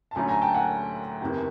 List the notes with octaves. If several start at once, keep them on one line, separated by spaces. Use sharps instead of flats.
A5
D2 D3 F#3 A3 C#4 G#5 A#5
G#5 A#5
G5 A5
F#5 G#5
F#1 E2 C3 D#3